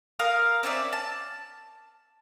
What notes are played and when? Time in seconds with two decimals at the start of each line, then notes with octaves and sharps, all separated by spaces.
0.19 A#4 F5 D#6
0.63 C4 C#4 D5 E5
0.93 A5